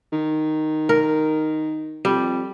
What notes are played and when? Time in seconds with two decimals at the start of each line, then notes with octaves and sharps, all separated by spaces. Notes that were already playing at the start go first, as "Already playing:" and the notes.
0.13 D#3
0.89 A#4
2.05 F2 G3